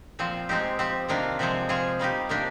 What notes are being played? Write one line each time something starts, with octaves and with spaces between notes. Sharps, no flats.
A#2 F3 C4
G#3 C4 D#4 G4
F3 C4 G4
C3 D#3 A#3 D4 F4
C3 F3 G#3 C4
F3 C4 F4 G#4
G3 A#3 D#4 G4
C3 D#3 A#3 D4 G4